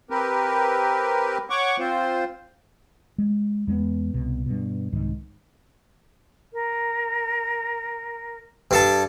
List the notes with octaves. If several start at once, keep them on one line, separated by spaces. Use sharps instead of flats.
C4 G4 A#4 B4
C#5 F#5 C#6 D6
C4 F4 C5
G#3
E2 G#3 A3 B3
C2 B2
G2 B2
C2 G#2 D#3
A#4
G2 A4 A5